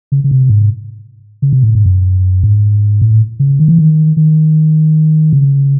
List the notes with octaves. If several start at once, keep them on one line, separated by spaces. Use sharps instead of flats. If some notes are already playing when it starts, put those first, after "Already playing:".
C#3
C#3
C3
G#2
C#3
C3
A2
G#2
F#2
G#2
A2
C#3
D#3
E3
D#3
D#3
C#3